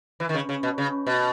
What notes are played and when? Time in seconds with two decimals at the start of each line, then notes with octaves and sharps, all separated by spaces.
0.20 E3
0.29 D#3
0.34 C#3
0.49 C#3
0.63 B2
0.78 C#3
1.07 B2